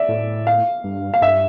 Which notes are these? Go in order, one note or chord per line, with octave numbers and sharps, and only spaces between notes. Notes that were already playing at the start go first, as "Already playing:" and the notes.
Already playing: D5 E5
A2
F5
G2
F5
G2 E5